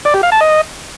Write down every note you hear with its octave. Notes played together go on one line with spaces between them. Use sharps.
D5
G4
F5
A5
D#5